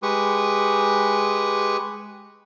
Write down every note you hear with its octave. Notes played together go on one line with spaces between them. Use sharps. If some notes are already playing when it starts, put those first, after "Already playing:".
G#3 G4 B4 C#6 D#6